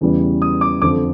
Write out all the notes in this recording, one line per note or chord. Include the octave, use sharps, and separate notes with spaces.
E2 C#3 E3 G3 B3
D#6
D6
F2 D3 F3 D6